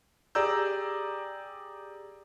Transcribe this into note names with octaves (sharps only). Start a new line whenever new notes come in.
G4 G#4 D5 A#5 E6 G6